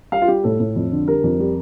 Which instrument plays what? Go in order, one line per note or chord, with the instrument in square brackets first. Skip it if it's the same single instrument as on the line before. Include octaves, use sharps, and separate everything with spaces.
[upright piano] G3 F5
F4
G3 G4
A2 A4
A2
F2
D3
G3 A#4
F2
G3